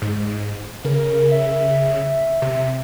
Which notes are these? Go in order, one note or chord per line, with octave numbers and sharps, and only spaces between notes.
G#2
C#3 A#4
E5
C3